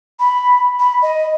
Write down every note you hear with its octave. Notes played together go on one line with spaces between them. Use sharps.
B5
B5
D#5